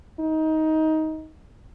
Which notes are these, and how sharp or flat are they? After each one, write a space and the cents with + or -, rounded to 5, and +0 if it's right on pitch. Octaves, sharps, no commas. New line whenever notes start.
D#4 +15